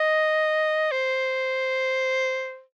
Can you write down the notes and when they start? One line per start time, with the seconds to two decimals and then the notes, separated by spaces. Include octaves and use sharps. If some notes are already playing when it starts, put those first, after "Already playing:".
Already playing: D#5
0.92 C5